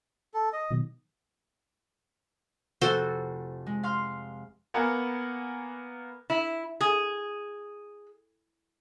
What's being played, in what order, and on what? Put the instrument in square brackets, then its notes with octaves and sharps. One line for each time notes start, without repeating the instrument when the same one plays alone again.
[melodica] A4
D#5
[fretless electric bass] B2 D#3 F#3
[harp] F1 [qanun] F#4 A4 C5
[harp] G#3
F5 C6 F6
[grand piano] A#3 B3 A#4 F#5 G#5 A#5
[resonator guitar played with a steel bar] E4
G#4